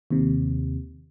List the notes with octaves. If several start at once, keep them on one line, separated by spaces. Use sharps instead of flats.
D#2 C3